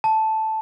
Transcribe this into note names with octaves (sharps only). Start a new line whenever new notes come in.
A5